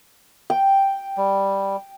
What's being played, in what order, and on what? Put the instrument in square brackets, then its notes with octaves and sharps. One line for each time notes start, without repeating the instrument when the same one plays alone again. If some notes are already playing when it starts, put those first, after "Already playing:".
[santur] G5
[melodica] G3